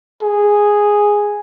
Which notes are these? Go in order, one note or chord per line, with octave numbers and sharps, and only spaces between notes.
G#4